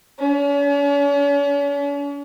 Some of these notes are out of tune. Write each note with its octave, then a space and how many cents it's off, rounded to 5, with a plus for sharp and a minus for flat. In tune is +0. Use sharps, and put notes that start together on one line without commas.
C#4 +45